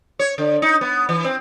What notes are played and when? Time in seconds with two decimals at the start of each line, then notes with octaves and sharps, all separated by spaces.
0.19 C#5
0.38 D3
0.62 D#4
0.81 B3
1.09 E3
1.24 C4